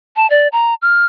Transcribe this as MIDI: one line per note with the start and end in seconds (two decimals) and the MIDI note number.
0.16 0.29 81
0.30 0.48 74
0.52 0.74 82
0.82 1.06 89